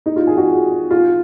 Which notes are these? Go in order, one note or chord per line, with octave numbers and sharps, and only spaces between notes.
D#4
F4
G#4
F#4
F4